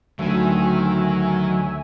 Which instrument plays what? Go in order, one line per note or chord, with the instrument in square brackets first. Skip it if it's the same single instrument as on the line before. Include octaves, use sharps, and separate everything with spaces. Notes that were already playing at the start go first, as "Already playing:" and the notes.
[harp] D2 [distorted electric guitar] D#3 [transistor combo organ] F#3 [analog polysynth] E5 G#5